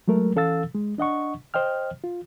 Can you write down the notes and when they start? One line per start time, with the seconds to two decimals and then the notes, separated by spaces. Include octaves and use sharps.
0.08 F#3 G#3 A3 A#4
0.35 E3 C#4 A4 F5 E6 A6
0.75 G#3
0.98 D4 D#5 F#5 C#6
1.54 C5 D#5 G5 F6
2.04 F4